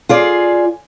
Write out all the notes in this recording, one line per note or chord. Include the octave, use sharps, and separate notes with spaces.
F4 G#4 D5